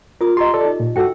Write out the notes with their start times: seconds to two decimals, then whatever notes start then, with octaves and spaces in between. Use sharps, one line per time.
0.21 F4 A#4 D#6
0.37 G4 D#5 A#5 C6
0.54 A4 D5
0.65 D#4
0.80 A#2
0.96 G2 F#4 A4 G5 E6